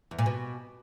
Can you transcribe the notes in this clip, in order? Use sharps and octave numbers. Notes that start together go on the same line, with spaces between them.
E2
A#2
B2